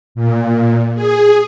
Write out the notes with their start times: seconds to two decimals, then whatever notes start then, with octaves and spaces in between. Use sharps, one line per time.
0.15 A#2
0.95 G#4